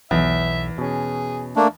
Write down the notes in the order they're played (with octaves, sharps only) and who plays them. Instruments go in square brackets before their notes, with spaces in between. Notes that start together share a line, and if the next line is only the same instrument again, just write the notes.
[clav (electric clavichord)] B1 [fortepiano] E2 [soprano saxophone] E5
[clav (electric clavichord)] B2 C#4 [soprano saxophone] G#4
[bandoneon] A3 A#3 D4